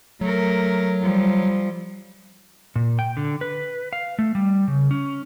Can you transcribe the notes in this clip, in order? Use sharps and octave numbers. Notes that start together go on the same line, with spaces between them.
F#3 A3 A#4
F3 G3
A#2
G5
D3
B4
F5
A3
G3
C#3
C#4